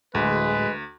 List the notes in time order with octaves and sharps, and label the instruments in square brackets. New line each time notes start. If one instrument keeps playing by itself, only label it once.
[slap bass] D1 [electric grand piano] D2 [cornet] G#3 [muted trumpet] B4